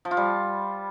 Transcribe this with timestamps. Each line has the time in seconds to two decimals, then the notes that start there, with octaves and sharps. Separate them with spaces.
0.05 F3
0.11 F4
0.17 G3